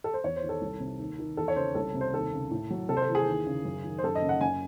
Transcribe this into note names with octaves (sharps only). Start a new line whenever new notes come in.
A4
C5
E2 C#5
C5
D#3
A4
C2
C3
D#2
D#3
E2 A4
C#5
C#3 C5
C2 A4
C3
C5
D#2 A4
C#3
A2
F#3
C3 A4
C5
A4
E3
G#4
D#2
C#3
F#2
D#3
C5
F#2 A4
D#5
C#3
F#5
F#2 G#5